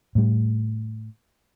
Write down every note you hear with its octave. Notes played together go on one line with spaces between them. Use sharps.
A2 G3